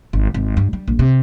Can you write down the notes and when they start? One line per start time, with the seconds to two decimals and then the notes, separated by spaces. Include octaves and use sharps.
0.13 G#1
0.34 G#1
0.57 G2
0.73 G3
0.88 A#1
0.99 C3